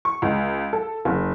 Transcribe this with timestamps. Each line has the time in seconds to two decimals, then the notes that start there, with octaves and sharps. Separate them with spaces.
0.05 C#6
0.22 C#2
0.73 A4
1.05 F#1